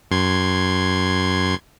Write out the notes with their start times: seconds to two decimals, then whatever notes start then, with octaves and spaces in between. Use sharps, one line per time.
0.11 F#2 C6 G#6